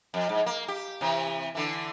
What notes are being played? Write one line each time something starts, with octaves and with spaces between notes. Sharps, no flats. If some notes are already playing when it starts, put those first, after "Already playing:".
F2
G#2
A#3
G4
C3 E3
D3 E3